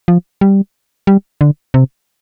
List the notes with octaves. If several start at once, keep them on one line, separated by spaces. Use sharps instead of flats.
F3
G3
G3
D3
C3